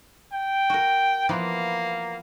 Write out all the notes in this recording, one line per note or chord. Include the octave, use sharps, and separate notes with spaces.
G5
F#4 A#4
E3 F3 A#3 B3